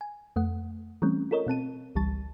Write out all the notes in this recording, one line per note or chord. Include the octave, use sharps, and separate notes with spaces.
G#5
F2 A3 F#5
E3 G3 A3 C4 C#4
F4 A4 A#4 C#5 D#5
B2 C4 A5 D#7
G#1 C#2 E3 G3 A5 A6